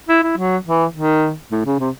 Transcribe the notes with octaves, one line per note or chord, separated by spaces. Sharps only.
E4
E4
F#3
E3
D#3
A2
C#3
C3